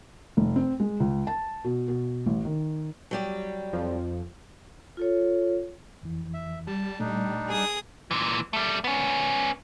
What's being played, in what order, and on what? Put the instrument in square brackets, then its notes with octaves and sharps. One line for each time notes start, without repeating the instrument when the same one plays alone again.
[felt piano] F1
C4
G#3
C#2
A5
B2
B2
A1
D#3
[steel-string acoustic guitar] F#3 G3 G4
[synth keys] F2 F3
[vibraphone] F4 A4 C#5
[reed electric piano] F2 E3
[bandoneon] E5
[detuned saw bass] G3 [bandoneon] A5
[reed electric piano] A#2 A3 [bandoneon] D4 D#4
[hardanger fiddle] G#4 D#6
[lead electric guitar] A#2 E3
G3 A3
B3 C#4